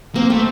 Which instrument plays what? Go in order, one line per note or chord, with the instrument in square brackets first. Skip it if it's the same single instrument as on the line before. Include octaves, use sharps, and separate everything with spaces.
[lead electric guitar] A#3 [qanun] C4
[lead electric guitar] A3 [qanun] C4